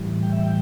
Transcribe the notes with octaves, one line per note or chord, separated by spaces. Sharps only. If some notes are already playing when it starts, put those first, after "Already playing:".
Already playing: A2 E3 G3
G5
E5
G5